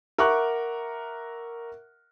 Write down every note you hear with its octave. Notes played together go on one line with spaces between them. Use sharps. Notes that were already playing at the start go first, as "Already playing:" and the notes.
A#4 E5 F#5 C#6 D6 F#6